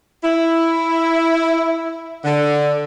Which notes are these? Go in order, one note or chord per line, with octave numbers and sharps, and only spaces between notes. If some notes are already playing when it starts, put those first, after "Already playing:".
E4
D3